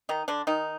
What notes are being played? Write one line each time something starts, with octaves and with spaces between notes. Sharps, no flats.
D#3 D#4
D3 D4
D#3 D#4